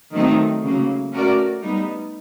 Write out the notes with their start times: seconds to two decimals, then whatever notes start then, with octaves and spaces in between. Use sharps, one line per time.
0.12 D#3 F#3 A3 C4 D#4
0.62 C#3 F#3 A#3
1.12 A3 C#4 F#4 A#4 D5
1.62 G3 B3 D#4